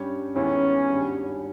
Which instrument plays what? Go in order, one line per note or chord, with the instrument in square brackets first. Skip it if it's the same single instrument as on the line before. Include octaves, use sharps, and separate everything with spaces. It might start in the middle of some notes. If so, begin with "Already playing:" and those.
Already playing: [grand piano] G2 G3 C#4 G4 C#5
[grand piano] D#2 D#3 G#3 B3 E4 [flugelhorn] C#4
[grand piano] G#1 G2 G3